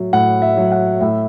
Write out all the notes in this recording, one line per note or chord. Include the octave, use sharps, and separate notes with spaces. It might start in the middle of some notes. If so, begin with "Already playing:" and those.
Already playing: A2 F#3 E5
A2 F#5
E5
F#3
F#5
A2 E5